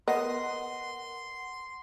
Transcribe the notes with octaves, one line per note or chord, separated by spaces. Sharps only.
B3 A#4 D#5 F#5 C6